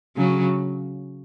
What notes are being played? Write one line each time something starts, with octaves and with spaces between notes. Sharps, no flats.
C#3 F#3